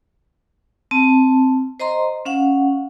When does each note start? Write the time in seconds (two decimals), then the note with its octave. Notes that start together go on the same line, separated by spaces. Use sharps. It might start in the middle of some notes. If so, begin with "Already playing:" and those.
0.91 C4 A5
1.80 C5 D#5 A#5 C6
2.25 C#4 F5 F#5